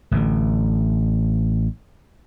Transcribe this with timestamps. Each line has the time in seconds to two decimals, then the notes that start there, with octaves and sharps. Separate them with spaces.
0.11 A1 D3